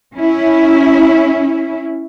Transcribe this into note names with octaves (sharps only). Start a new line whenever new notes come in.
C#4 E4